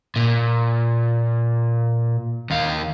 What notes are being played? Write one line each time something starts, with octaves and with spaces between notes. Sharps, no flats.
A#2
D#2 F5